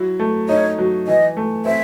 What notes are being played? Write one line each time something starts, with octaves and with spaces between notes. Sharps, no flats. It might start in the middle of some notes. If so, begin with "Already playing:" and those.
Already playing: F#3 E4
A3
D#4 C#5
F#3
E3 D#5
A3
C4 E5